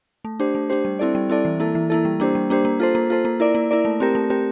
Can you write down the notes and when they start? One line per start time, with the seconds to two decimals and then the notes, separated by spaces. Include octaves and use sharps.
0.25 A3
0.40 D4 G4 C5
0.55 A3
0.70 D4 G4 C5
0.85 G3
0.99 C4 E4 A4 D5
1.15 G3
1.30 C4 E4 A4 D5
1.45 E3
1.60 A#3 E4 A4
1.75 E3
1.90 A#3 E4 A4
2.05 G3
2.20 A#3 D4 G4 C5
2.35 G3
2.50 A#3 D4 G4 C5
2.65 A#3
2.80 F4 A4 C5
2.95 A#3
3.10 F4 A4 C5
3.25 A#3
3.40 E4 A#4 D5
3.55 A#3
3.71 E4 A#4 D5
3.85 A3
4.00 C4 G4 A#4
4.15 A3
4.30 C4 G4 A#4